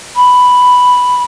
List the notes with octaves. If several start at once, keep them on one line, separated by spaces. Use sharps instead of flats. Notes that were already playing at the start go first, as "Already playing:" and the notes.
B5